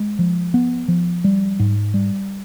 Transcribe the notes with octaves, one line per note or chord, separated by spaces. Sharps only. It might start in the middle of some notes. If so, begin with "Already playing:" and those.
Already playing: G#3
F3
B3
F3
G3
G#2
G3